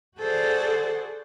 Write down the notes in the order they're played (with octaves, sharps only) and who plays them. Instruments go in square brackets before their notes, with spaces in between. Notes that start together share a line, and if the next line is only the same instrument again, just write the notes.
[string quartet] F#4 G#4 A4 C5 D5 F#5